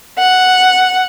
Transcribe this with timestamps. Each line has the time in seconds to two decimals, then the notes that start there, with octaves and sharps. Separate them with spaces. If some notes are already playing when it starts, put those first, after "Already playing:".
0.19 F#5